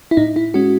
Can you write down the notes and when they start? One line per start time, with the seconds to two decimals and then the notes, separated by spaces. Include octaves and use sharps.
0.11 E4
0.17 A2 D#4
0.36 E4
0.54 G#3 C#4 F#4